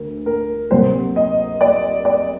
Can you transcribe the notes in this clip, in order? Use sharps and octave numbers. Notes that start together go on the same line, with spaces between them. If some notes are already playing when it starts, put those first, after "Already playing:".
Already playing: D2 A#4
A#4
C3 F#3 A#3 C5
D#5
D5
D5